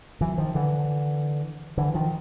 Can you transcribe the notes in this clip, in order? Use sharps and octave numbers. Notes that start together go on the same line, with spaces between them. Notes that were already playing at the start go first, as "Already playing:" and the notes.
E3 F#3
D#3 F3
D3 E3
D3 E3
D#3 F3